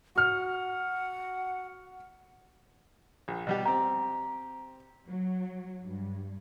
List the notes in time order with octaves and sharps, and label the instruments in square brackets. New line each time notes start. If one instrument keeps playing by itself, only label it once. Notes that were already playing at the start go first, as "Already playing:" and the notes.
[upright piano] F#4 F6 [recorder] F#5
[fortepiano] A#1
B2 G3 G4
[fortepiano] C4 G4 [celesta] A#5
[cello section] F#3
G2